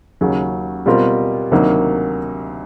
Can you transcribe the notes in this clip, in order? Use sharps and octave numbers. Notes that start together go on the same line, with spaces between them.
D#2 C#3 F#3
B2 G3 C4 F4 A#4
D2 C3 D#3 F#3 A#3